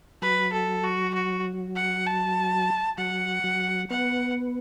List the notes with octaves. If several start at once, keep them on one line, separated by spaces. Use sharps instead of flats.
F#3 B4
A4
F#4
F#4
F#5
A5
F#3 F#5
F#3
B3 F#5